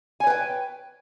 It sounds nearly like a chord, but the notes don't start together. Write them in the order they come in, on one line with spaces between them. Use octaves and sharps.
G#5 C#5 B4 G5